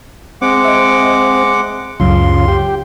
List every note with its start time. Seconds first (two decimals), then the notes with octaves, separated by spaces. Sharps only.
0.42 G#3 C4 F#5 D6
0.64 D#5 E5
2.00 C#2 F#2 C#3 F4 C6
2.48 G4